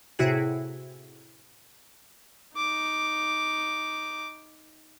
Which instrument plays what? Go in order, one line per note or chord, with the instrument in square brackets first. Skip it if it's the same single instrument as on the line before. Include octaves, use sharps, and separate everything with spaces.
[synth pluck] A2 C3 E4 F#4 G#4
[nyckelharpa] D#4 D6